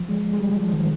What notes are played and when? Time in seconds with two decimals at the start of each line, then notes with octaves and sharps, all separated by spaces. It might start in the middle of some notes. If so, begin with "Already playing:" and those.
Already playing: F3
0.09 G#3
0.33 G#3
0.40 G3
0.56 F3
0.72 D#3